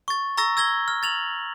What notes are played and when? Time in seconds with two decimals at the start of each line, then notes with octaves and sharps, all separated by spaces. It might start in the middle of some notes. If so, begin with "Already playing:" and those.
0.08 C#6 A6
0.37 A#5 C#6 E6 A6 A#6
0.57 E6 G#6 A#6 G7
0.88 F6
1.03 A6 F7 F#7